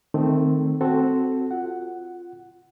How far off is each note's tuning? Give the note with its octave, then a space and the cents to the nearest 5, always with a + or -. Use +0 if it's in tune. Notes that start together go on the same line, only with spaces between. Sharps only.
D#3 -15 A3 +0 C4 +0
C4 +0 F#4 +0 A4 +0
F4 +0 F#5 +5